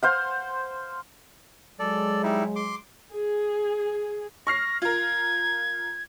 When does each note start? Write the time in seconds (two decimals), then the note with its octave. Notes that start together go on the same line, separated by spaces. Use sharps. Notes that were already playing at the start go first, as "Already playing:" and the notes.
0.03 C5 F5 F#5
1.79 F#3 G#3 A4 D5
2.23 G3 D#4 E4
2.56 C6 D6
3.11 G#4
4.47 C#6 F6 A#6 C7
4.82 F4 A#4 G#6